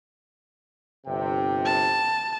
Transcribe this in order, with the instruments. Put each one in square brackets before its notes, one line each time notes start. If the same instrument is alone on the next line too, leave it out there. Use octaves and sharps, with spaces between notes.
[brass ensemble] G1 C3 G5
[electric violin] A5